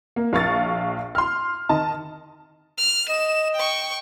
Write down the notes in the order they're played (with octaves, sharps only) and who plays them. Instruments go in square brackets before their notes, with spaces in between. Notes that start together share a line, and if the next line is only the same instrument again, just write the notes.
[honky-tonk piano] A#3
A#1 F5 C#6 A6
C6 F6
D#3 D#5 A5
[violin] F6
[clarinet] D#5 [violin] E7
[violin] G5 C#6